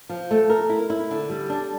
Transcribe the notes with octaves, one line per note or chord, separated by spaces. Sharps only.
F3
A3
A#4
E4
E4
D3
G3
D4